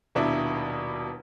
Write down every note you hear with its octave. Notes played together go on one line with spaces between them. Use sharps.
D#1 B2 D4 E4